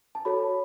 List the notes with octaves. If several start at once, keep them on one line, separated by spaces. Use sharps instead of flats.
A5
F#4 A4 C#5 B5